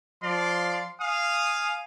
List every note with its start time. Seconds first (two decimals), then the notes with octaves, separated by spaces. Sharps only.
0.24 F3 D5 F5 C6
1.01 F5 G#5 D#6